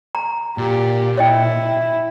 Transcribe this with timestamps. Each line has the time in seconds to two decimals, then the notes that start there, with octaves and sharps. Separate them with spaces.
0.15 A#5
0.58 A#2 G4
1.18 E4 C#5 D#5 G5